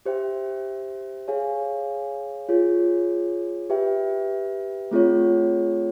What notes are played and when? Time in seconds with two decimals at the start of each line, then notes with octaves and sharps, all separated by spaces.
0.06 G4 C5 E5 G5
1.28 G#4 C#5 F5 G#5
2.49 F4 G#4 C#5
3.70 G4 B4 E5 G5
4.91 A3 C4 F4 G#4 C#5